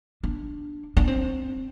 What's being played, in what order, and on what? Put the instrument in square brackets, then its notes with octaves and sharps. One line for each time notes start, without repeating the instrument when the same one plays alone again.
[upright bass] D4
D4
C4